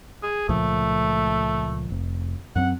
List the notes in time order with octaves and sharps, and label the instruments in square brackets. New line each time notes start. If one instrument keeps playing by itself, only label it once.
[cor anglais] G#4
[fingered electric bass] C#2 A#2 F3 [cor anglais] A3
[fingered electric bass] F1
[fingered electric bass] F#2 F#3 C4 [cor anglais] F#5